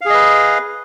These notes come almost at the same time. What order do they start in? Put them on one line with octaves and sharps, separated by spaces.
F5 G#4 D#5 B4